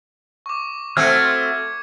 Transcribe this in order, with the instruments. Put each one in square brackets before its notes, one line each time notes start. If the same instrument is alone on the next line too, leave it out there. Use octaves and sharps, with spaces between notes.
[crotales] C#6 D6
[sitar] A3 C4 F#4 [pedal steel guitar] F6 [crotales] G#6 C#7